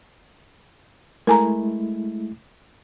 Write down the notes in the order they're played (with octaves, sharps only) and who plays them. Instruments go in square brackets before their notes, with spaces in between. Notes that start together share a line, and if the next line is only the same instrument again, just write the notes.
[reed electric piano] G#3 A3 E4 [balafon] A#4 G#5 A#5